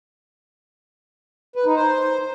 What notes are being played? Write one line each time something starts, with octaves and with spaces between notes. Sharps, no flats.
B4
D#4
C5